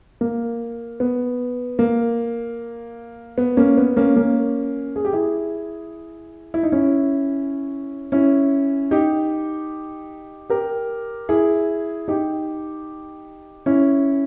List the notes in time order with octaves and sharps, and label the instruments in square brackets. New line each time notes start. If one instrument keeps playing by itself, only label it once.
[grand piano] A#3
B3
A#3
B3
A#3 C#4
B3
A#3 C#4
A#3 C#4
G#4
G4
E4 G#4
E4
D#4
C#4 E4
C#4 E4
D#4 G4
G4 A#4
E4 G#4
D#4 G4
C#4 E4